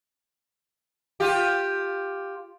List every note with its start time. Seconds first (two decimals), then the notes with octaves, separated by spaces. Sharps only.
1.20 F4 G4